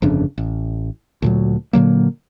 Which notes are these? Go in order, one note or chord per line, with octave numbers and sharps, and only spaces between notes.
G1 F2 C#3 D4
A1
D2 A#2 F#3
A#2 D3 F#3 A#3